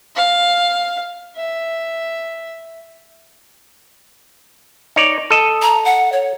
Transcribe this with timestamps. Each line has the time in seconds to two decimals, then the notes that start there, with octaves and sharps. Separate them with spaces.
0.16 F5
1.37 E5
4.96 D#4 C#5 D5
5.30 A4 D#5
5.62 A#5
5.85 F#5
6.12 C#5